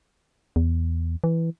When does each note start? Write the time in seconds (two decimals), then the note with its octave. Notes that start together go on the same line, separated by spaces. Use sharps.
0.56 E2
1.24 E3